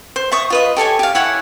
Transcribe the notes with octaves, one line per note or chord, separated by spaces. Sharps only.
C5
E5 C#6 D#6
F4 B4 D#5
G4 A4 C#5 G#5
G4 F5
E4 C#5 F#5 G#5